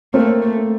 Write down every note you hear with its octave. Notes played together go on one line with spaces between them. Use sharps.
A3 A#3 C4
A3